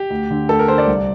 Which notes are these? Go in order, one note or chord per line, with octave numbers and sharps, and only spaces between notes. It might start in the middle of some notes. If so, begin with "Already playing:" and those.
Already playing: G4
D2
D3
D2 A4
A#4
D3 C5
D5
C2